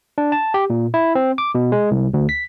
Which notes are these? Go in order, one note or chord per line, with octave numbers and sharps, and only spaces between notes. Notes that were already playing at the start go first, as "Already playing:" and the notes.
D4
A5
G4
A#2
E4
C4
D6
B2
G#3
C2
D2
B6